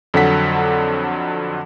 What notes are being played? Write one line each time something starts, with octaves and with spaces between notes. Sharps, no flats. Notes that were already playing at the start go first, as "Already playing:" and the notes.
F2 D3 F#3 A4 F#5 B6